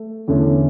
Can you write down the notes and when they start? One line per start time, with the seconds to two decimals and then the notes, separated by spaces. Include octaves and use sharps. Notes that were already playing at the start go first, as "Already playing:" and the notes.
Already playing: A3
0.28 E2 D3 A3 C#4